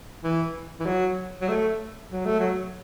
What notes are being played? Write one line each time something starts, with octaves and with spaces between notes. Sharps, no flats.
E3
E3
F#3
F#3
A3
F#3
A3
F#3